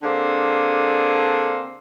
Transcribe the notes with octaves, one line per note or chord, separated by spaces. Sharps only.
D3 A#3 C4 D4 G#4